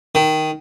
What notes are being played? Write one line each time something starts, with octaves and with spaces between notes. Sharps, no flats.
D#3